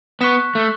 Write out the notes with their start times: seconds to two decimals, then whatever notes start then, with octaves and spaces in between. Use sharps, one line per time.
0.21 B3 C#6 F#6 B6 E7
0.55 A3